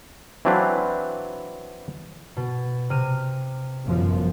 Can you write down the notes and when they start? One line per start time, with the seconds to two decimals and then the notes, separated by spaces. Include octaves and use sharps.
0.45 E3 F#3 C4 D4 B4 F5
2.37 B2
2.90 C3 F6 D#7
3.85 G1 F#2 F3